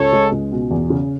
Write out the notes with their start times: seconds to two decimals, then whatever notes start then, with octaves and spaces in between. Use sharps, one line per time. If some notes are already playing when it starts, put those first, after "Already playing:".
Already playing: C#2 A4 C#5
0.13 G#3
0.32 C#2
0.52 B2
0.71 E2
0.90 C#3